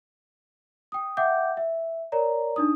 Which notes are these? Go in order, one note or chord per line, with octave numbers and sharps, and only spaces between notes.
G5 D#6
E5 F#5 G5 D6 G6
E5
A#4 C#5 D5 A#5
D4 D#4 D#6